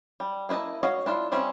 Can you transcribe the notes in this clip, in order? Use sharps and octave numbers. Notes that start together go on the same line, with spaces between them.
G3
A#3 E4 B4 D#5 A5
F#4 C#5 D#5 F5
D4 E4 F4
G3 C4 C#4 E5